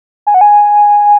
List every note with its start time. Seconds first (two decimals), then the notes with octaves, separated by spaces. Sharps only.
0.27 G#5
0.34 F#5
0.41 G#5